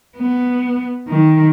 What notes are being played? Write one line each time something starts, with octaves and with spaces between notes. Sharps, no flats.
B3
D#3